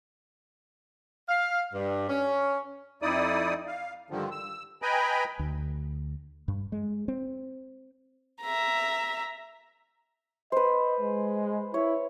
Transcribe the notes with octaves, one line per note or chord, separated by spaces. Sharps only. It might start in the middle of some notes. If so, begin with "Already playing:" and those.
F5
G2
C#4
F2 D#4 E4 D5 D#6
F5
G2 D3 D#3 F3
E6
B4 D#5 G5 G#5 A#5 B5
D2
G2
G#3
C4
E5 A#5
B4 C5 D#5
G#3
E4 C#5